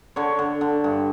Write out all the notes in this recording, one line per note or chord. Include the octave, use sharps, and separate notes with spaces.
D3 C#5
D3
D3
G2